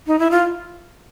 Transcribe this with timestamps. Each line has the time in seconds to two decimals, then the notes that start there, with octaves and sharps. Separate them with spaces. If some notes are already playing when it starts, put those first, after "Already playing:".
0.07 D#4
0.19 E4
0.31 F4